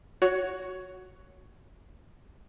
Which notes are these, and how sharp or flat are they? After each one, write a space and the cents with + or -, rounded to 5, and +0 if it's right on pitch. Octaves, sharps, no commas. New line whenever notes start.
F#4 +0 C#5 +15